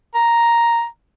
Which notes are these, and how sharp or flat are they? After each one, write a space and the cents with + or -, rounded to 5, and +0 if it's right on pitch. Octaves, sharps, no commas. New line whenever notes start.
A#5 +5